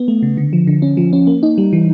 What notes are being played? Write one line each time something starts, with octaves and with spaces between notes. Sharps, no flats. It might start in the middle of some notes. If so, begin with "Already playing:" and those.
Already playing: B3
A3
C#3
D3
F3
D3
C#4
F3
C#4
A#3
D#4
G3
E3